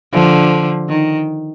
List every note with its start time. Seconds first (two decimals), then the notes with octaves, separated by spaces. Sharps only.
0.12 D3 F3
0.89 D#3